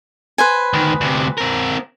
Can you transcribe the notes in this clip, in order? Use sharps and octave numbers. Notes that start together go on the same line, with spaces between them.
B4 C5 G#5
D2 D#3
D2 C3
C4 A#4